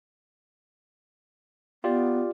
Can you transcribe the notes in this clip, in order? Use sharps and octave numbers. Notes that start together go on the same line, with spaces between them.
B3 F4 G4 D5